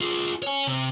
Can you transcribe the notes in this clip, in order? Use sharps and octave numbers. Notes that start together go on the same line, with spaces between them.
F4 G#4
C#5 G#5
C3